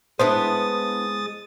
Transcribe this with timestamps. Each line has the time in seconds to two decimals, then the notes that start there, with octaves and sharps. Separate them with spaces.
0.19 G#3 B3 D4 E4 C5 D#6 A6